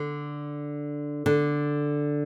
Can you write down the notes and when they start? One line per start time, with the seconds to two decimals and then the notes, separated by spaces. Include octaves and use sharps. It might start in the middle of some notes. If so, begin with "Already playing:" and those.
Already playing: D3
1.26 D3